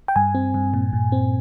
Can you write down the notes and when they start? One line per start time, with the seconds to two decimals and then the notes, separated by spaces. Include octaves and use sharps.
0.08 G5
0.16 G2 G#5
0.35 C4
0.54 G2
0.74 A#2
0.93 A#2
1.12 C4